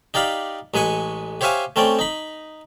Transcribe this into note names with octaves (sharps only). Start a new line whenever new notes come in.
D#4 G4 D5 F5 B5
A1 G#3 B4 G#5 C#6
G4 C5 C#5 E5 F5 G#5
A3 C4 C#4 D5 G5
D#4 B5